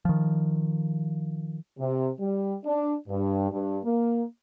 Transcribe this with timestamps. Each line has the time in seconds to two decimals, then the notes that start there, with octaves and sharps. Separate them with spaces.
0.05 D#3 F3
1.79 C3
2.20 G3
2.64 D4
3.08 G2
3.50 G2
3.84 A#3